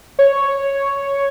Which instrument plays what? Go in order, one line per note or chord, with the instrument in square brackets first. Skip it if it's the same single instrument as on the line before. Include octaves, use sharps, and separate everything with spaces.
[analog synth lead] C#5